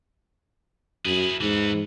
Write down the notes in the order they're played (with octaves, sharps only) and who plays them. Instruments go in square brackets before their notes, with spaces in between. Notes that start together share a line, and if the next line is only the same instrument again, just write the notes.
[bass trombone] F#2 [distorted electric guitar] E4 G#4
[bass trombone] G#2 [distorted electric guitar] E3 B3